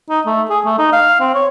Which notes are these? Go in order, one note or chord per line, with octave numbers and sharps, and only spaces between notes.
D#4
A3
G#4
A3
D#4
F5
C4
C#5